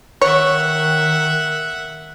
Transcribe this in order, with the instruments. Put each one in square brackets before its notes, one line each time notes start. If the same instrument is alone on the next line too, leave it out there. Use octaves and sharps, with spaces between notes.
[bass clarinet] D#3 [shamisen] C#5 [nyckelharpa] E5 F#5